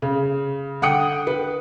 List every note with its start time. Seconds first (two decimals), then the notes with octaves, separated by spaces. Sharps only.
0.02 C#3
0.82 D3 F#5 G5 D#6 C#7
1.27 B4